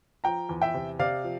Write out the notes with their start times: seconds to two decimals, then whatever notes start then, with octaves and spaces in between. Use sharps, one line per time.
0.24 F3 G5 A#5
0.49 E2
0.62 E5 G5
0.74 C3
0.99 C3 D5 F5
1.24 F3